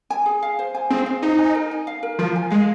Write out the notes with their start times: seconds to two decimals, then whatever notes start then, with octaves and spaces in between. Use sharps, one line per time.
0.10 G#5
0.26 G#4
0.43 F5
0.59 C5
0.75 G#5
0.90 C4 G#4
1.06 F5
1.22 D#4 C5
1.39 G#5
1.55 A#4
1.71 G#5
1.87 F5
2.03 A#4
2.19 F3 A#4
2.36 G#5
2.51 G#3 F5